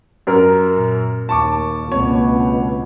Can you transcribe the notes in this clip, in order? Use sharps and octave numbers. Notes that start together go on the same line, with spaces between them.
F#2 A#4
A#2
D#2 A5 C#6 D6
C#2 B2 G#3 A#3 C4 C#5